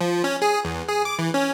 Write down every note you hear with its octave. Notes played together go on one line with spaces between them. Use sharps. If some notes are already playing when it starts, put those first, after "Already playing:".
F3
C#4
G#4
E2
G#4
D6
E3
C#4